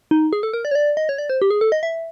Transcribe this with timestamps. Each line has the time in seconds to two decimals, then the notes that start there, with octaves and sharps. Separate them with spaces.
0.11 D#4
0.33 G#4
0.43 A4
0.53 A#4
0.65 D5
0.71 C#5
0.75 D5
0.97 D#5
1.09 C#5
1.18 D5
1.30 C5
1.42 G4
1.51 G#4
1.61 A4
1.72 D#5
1.83 E5